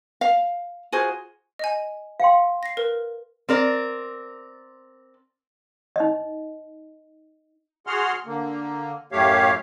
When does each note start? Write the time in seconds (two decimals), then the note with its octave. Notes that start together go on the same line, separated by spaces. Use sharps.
0.21 F5
0.92 F4 F#4 G#4 C5
1.59 D#5 G#5
2.20 F5 G5 C6
2.63 A#6 C7
2.77 A#4 B4
3.49 C4 A#4 D5
5.96 D#4 D#5
7.87 F#4 G#4 F#5 C6 F6
8.26 D3 A#3
9.12 F#2 A2 A3 G4 C#5 F5